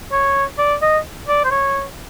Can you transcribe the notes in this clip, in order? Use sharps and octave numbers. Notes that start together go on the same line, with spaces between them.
C#5
D5
D#5
D5
C5
C#5